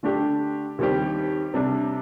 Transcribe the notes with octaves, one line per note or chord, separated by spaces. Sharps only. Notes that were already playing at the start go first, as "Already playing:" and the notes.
D3 A3 D4 G4
D#2 D#3 G3 C4 G4
C3 G3 D4